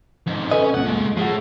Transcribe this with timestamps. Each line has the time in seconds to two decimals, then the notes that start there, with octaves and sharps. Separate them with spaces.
0.27 F2 G#2
0.51 C#4 A4 B4 D#5 G#5
0.74 C#2 F#2 A#2 F#5
0.86 G#3 A3
1.17 A2 F3 G#4 F#5